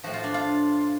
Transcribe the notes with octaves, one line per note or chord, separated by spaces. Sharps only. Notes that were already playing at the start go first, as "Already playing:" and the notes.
A2 F3 F#4
F4
D4
F4